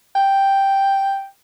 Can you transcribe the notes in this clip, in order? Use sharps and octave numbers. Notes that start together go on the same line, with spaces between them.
G5